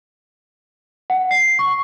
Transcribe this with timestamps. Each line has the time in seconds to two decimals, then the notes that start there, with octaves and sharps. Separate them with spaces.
1.10 F#5
1.31 C7
1.59 C#6